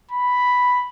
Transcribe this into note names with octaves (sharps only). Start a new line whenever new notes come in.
B5